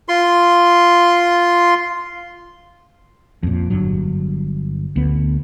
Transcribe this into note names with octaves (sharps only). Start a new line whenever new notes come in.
F4 C6
F2 A#2
G1 G2 F#3
D2 B3